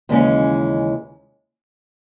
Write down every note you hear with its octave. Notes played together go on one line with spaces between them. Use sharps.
D#2 C#3 E3 G#3 C#4